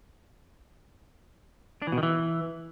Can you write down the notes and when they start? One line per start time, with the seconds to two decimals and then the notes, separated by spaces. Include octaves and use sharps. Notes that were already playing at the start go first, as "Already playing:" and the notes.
1.82 D4
1.87 E3
1.92 B2
1.98 D#3
2.03 E3